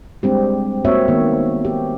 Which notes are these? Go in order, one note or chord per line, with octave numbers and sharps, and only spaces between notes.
G3 G#3 C4 D4 G4
A#3 C4 F#4 C#5 E5
D#3 A#3 B3
G4